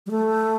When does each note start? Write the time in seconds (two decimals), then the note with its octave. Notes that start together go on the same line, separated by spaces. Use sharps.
0.06 G3
0.11 A3